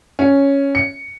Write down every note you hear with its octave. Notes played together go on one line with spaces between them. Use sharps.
C#4
C#7